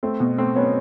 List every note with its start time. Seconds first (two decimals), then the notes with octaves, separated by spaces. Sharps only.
0.03 A3 C4
0.20 B2
0.38 A3 C4
0.55 F#3 B3 C#4